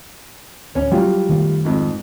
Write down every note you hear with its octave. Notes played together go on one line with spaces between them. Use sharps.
D1 C#4 C#5
F#3 G3 F4 F#4
D#3 A3
F2 G#2